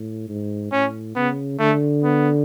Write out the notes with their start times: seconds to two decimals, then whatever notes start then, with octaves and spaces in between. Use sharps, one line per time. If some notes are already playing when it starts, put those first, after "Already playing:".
Already playing: A2
0.29 G#2
0.72 A2 C#4
1.16 C#3 B3
1.59 D3 A3
2.04 B3